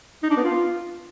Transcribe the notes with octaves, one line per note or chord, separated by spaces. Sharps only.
D#4
D4
B3
F4